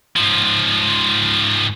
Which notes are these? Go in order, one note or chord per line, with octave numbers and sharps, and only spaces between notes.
G#2 F3